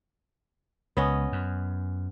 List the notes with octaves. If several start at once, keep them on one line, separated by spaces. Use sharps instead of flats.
C#2 B3 C#4 D#5
F#2